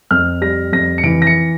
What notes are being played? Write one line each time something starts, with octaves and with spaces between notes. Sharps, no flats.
F2 F6
G3 A#6
F2 A#6
C#7
E3 D7
A#6
C#7